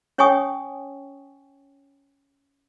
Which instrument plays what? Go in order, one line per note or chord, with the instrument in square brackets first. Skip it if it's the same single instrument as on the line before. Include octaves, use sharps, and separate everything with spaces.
[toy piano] C#4 C#5 G5 G#5 C#6 D#6